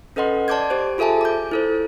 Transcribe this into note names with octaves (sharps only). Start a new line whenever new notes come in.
C#4 A4 B4 D#5 F#5 C6
D5 A5 C6 D6 G6 G#6
G4 C5
F4 G#4 A4 E5 G#5 A5
D6 G6
E4 A4 C5